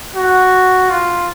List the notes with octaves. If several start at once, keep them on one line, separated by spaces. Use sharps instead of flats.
F#4
F4